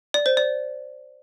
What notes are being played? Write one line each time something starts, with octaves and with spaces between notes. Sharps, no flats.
D5
C5
D5